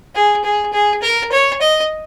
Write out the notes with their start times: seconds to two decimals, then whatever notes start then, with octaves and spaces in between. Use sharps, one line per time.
0.15 G#4
0.44 G#4
0.73 G#4
1.02 A#4
1.32 C#5
1.61 D#5